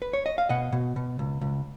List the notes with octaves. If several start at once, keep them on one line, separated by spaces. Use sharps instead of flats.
B4
C#5
D#5
F5
B2 D#5 F#5
B2
B2
C#2
C#2